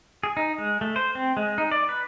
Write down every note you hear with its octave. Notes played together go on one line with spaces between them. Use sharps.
G#4
D#4
G#3
A3
C5
C4
G#3
D#4
D5
B4